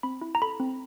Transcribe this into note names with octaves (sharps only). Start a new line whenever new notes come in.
C4 B5
E4
A#5
A4 B5
C4